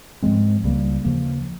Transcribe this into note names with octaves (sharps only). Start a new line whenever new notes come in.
G#2 F3 G#3 C4
C#2 C#3 G3 A#3
D#2 C#3 F3 A#3